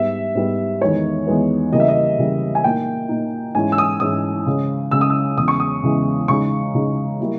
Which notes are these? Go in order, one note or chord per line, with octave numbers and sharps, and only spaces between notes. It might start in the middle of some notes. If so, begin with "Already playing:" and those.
Already playing: G#2 G3 B3 E5
G#2 G3 B3
E2 D#3 G#3 B3 E4 C#5
E2 D#3 G#3 B3 E4
C#3 E3 G3 A#3 D#5
E5
D#5
C#3 E3 G3 A#3
G#5
A#2 A#3 D#4 G5
A#2 A#3 D#4
G#2 E3 G#3 C#4 E4 G#5
E6
D#6
G#2 E3 G#3 C#4 E4 D#6
C#3 G#3 C#4
C#3 G#3 C#4 E6
D#6
E6
E2 C#3 E3 G#3 C#4 D#6
C#6
D#6
E2 C#3 E3 G#3 C#4
C#3 G#3 D#4 C#6
C#3 G#3 D#4
G3 A#3 E4